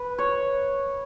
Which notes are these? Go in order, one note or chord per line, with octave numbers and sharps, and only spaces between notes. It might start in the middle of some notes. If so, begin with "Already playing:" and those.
Already playing: B4
C#5